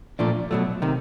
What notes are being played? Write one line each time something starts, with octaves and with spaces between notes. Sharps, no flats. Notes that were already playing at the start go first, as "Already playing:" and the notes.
A#2 F3 A3 D4
B2 F#3 A3
C3 D#3